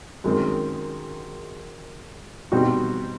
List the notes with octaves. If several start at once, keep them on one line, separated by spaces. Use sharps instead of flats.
F#2 D#3 G#3 C4
B2 G3 C4 D#4 F#4